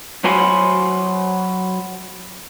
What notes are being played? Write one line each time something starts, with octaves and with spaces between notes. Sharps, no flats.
F#3 C5 G#5 B5 C6